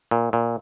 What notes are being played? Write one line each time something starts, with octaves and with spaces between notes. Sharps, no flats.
A#2
A#2